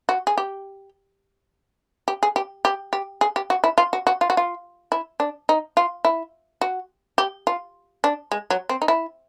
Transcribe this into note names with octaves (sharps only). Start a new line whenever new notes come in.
F#4
G#4
G4
G4
G#4
G4
G4
G4
G#4
G4
F#4
E4
F4
F#4
F#4
F4
F#4
F4
E4
D4
D#4
F4
E4
F#4
G4
F4
D4
G#3
F#3
C4
D#4
E4